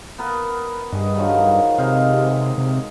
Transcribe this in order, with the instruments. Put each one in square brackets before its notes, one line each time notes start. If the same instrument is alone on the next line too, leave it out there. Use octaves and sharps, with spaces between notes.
[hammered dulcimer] B3 A#4 B4
[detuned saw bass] G2 [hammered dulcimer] G#4 D#5
[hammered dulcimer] D#3 F3 F#3
[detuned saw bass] C3 [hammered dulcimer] G#3 D#4 F5
[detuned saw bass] C3